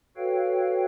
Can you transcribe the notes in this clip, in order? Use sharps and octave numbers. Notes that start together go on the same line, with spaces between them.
F#4 A4 B4 C#5 F5 G5